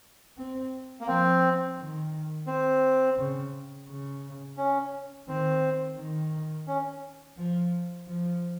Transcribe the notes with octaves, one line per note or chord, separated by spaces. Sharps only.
C4
A#3
F3 C4
D#3
C4
C#3
C#3
C#4
D#3 C4
D#3
C#4
F3
F3